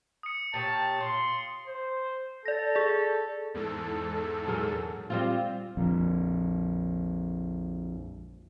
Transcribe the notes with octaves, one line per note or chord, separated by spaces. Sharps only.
D#6 C#7
A#2 G4 C#5 A5
F4 C6
C5
A4 D5 A#6
G#4 D5
E2 G#2 A4
F#3 G#4 A#4
G3 C4 F4
A#1 F2